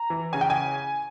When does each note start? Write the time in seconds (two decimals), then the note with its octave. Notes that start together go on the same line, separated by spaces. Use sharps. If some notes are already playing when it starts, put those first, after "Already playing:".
Already playing: A#5
0.10 E3
0.33 C#3 G#5
0.41 G5
0.50 G#5